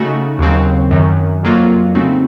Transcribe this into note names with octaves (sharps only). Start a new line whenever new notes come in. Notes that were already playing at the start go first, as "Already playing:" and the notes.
Already playing: C#3 A3 D#4 F#4
D#2 C#3 F#3 C4
F#2 D#3 F#3
F2 C3 F#3 A#3 F4
C#3 A3 C4 D#4 F#4